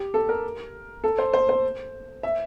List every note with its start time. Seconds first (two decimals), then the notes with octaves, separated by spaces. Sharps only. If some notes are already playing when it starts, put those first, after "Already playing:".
Already playing: G4
0.14 A4
0.29 A#4
1.04 A4
1.18 C5
1.33 C5
1.49 C5
2.23 E5